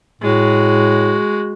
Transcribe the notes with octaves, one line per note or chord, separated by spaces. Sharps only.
A2 G#3 F#4